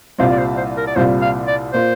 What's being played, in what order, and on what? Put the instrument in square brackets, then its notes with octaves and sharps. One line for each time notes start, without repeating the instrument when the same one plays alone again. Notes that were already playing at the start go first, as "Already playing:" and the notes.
[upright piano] C2 A#2 G3 C4 F4 [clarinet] C5
[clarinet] D5
C5
C5
A#4
D5
[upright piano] C2 A#2 G3 C4 F4 [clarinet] C5
[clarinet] F5
D5
[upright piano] A#2 A#3 F4 [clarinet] C5